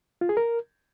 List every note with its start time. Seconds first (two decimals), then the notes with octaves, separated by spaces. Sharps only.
0.21 F4
0.29 G#4
0.37 A#4